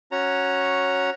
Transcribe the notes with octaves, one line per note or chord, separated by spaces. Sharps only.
C#4 F#4 C#5 A#5